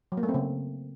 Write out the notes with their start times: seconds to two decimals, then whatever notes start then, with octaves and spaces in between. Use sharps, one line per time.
0.12 F#3
0.17 A#3
0.23 A3
0.29 C4
0.34 C#3